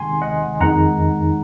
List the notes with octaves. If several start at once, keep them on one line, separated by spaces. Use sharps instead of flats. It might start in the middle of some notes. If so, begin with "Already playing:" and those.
Already playing: C3 D#3 G#3 F#5 G#5 C6
D#5 F#5
F2 D#3 G#3 D#4 F#5 A#5